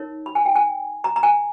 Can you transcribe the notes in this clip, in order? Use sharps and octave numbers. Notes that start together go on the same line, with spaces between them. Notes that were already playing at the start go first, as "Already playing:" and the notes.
Already playing: D#4 A#4 C#5
B5
G#5
G5
G#5
A#5
A#5
G#5